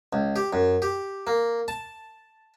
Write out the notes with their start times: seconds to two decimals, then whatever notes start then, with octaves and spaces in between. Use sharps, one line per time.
0.13 C#2
0.36 G4
0.53 F#2
0.82 G4
1.27 A#3
1.68 A5